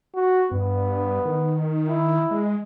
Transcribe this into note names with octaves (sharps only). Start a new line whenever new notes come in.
F#4
G2 B3
D#3
E4
G#3